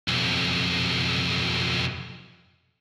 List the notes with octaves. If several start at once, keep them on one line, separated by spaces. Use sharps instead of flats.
B1 F2